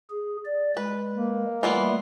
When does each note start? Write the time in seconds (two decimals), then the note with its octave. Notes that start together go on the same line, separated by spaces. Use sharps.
0.10 G#4
0.46 D5
0.77 G#3 B4
1.14 A#3
1.63 E3 G3 A3 B3 F4